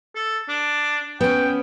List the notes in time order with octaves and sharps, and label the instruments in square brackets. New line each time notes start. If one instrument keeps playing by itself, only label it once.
[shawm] A4
D4
[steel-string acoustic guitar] B3 C#4 [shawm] G5